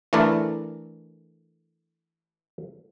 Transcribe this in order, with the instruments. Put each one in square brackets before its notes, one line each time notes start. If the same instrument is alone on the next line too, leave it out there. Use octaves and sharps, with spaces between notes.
[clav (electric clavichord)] E3 A3 D4 E4 A4 A#4